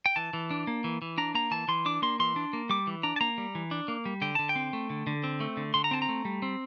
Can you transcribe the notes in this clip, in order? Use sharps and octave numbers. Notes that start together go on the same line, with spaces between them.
G5
E3 A5
E3
D4
A#3
E3
E3
D4 A#5
A#3 A#5
E3 A5
E3 C6
D4 D6
A#3 C6
E3 C6
D4
A#3
G3 D6
E3
D4 A#5
A5
A#3 A#5
G3
E3
D4
A#3
G3
D3 G5
D3 A5
G5
C4
A3
D3
D3
C4
A3
D3
D3 C6
A#5
C4 A5
A#5
A3
G3
C4